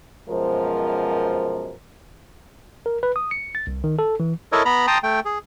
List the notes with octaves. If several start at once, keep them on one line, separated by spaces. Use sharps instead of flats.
F#2 B2 F3 G#3 A#4 C5
A#4
B4
D#6
C#7
A6
C2
D#3
A4
E3
E4 A4 A#4 C#5 D#5
B3 A#5 B5
G5 A5 A#5 C6 D#6
A3 G5
G#4